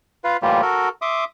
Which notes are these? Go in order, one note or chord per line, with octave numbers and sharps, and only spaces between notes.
F4 B4 F5
A2 E3 G3 A#3 F4 G4
F#4 A4 A#4
E5 C6 D6 D#6